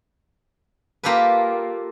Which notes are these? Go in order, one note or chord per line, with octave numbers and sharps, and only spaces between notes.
A#3 F4 G4 A4 B4